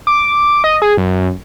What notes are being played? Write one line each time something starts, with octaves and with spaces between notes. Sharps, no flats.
D6
D#5
G#4
F#2